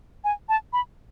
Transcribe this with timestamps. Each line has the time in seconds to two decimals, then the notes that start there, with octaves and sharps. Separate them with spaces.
0.24 G#5
0.49 A5
0.73 B5